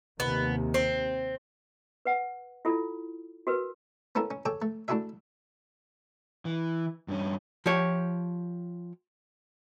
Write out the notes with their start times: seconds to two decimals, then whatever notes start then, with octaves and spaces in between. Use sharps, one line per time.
0.20 D#2 C3 B3
0.74 C4
2.05 B4 F#5
2.65 E4 F4 A4
3.47 F#4 A#4 B4
4.15 B3 C#4 E4 A4 A#4
4.31 C#4
4.45 G#4 A4 C#5 G5 G#5 D6
4.62 A3
4.88 A3 D4 E4 F#4 G#4 E5
6.45 E3
7.08 G2 C#4
7.66 F3 G4 C#5